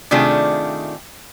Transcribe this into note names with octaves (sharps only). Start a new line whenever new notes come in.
C3 D#3 A3 D4 F4 G#4